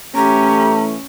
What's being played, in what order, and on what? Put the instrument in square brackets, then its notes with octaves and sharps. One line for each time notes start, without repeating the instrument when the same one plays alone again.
[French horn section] A2 E3 A3 [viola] C#4 [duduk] G4 [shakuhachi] A#5